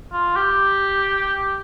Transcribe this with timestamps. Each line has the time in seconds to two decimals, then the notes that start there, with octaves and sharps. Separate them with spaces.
0.12 F4
0.36 G4